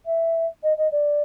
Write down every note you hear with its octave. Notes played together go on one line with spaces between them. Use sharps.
E5
D#5
D#5
D5